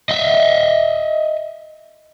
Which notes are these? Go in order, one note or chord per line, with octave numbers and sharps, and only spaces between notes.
D#5 E5